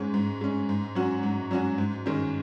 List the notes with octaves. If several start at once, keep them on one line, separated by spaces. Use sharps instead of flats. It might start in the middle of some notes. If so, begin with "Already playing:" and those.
Already playing: G#2 G#3 C#4
G#2
G#3 C#4
G#2
F#3 C#4 F#4
G#2
F#3 C#4 F#4
G#2
D#3 G#3 C#4